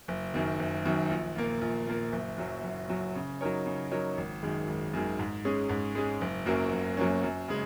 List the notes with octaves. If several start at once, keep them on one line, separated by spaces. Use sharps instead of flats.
F#1
F#2 D#3
F#1
F#2 D#3
A#1
A#2 A#3
A#1
A#2 A#3
F#1
F#2 F#3
F#1
F#2 F#3
C#3
F#3 D#4 A#4 C#5
C#3
F#3 D#4 A#4 C#5
G#1
F#2 D#3 G#3
G#1
F#2 D#3 G#3
G#2
G#3 C#4 G#4
G#2
G#3 C#4 G#4
F#1
F#2 F#3 A#3 C#4
F#1
F#2 F#3 A#3 C#4
F#2
C#3 G#3